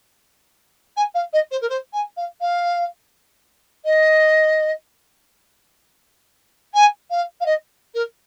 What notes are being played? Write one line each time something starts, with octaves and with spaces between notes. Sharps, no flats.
G#5
F5
D#5
C5
A#4
C5
G#5
F5
F5
D#5
G#5
F5
F5
D#5
A#4